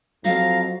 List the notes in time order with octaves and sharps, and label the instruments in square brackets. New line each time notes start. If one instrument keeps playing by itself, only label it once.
[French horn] F2 [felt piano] F#3 [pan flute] F5 [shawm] A#5